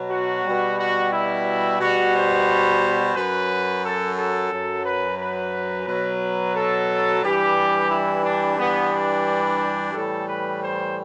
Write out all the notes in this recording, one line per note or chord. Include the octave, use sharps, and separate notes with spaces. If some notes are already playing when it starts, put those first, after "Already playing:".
Already playing: B2 F#3
F#4
B2 G3
F#4
E4
B2 G3 F#4
C5
F#2 F#3 B4
A4
A4
F#2 F#3
B4
B4
B2 F#3 B4
A4
G2 E3 G3 G4
E4
D4
G2 E3 G3 B3
D4
A2 E3 G3 A4
B4
C5